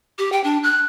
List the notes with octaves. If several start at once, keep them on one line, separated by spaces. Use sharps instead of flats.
G4
G5
D4
F#6